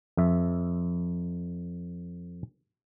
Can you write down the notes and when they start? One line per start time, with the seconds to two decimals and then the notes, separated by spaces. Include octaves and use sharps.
0.17 F2 E5